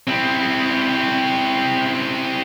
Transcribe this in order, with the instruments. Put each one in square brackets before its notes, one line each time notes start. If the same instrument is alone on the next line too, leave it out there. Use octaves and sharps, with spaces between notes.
[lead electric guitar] C4 E4